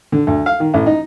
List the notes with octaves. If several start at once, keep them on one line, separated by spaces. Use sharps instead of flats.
D3
D2
F5
D#3
A1
D#4